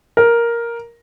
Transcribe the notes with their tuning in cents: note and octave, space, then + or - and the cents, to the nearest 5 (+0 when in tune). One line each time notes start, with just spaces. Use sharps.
A#4 +5